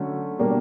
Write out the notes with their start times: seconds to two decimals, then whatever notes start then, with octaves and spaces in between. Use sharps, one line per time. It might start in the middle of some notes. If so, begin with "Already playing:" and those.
Already playing: D3 F#3 A3 C#4
0.39 B2 G3 A#3 D4